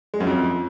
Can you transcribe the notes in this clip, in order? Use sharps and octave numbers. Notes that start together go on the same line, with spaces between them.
G#3
F#2
F2